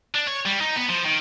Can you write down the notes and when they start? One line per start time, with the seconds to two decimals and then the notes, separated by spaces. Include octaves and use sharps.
0.15 D4
0.27 C#5
0.46 G3
0.61 D#4
0.76 B3
0.90 F3
1.06 D#3